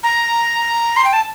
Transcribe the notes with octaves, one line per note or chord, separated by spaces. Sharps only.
A#5
C6
G5
A5